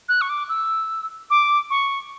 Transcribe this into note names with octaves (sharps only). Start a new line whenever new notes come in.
F#6
C#6
D6
E6
D6
C#6